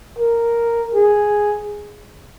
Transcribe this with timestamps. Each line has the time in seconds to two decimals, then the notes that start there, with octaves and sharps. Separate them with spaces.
0.19 A#4
0.95 G#4